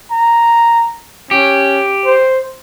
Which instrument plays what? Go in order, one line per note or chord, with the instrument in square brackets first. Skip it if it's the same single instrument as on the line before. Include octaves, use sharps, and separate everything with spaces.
[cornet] A#5
[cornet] C#4 [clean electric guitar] G4
[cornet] C5